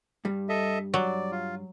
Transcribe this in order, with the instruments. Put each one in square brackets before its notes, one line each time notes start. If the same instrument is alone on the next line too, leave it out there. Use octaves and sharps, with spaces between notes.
[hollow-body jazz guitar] G2 G3
[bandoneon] A4 D#5 E5
[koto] F#3 [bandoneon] D5
[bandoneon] F4